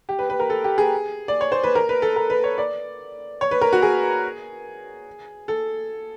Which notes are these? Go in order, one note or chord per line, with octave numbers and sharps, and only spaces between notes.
G4
B4
B4
A#4
A4
G4
G#4
D5
C#5
C5
B4
A#4
B4
A4
A#4
B4
C#5
D5
C#5
B4
A#4
F#4
G#4
A4